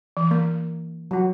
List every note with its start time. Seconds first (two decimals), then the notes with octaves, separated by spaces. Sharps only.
0.17 E3
0.31 A#3
1.11 F#3 F#4